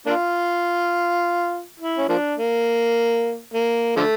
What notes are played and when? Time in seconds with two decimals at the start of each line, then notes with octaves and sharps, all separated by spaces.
0.06 A#3 D4 F4
1.80 E4
1.98 C#4
2.09 F3 A#3 D4
2.37 A#3
3.54 A#3
3.96 D3 F3 A3